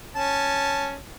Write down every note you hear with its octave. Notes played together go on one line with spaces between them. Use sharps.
C#4 A5